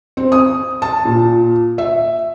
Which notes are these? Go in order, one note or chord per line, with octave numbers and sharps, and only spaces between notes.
C4
D#6
A5
A#2
E5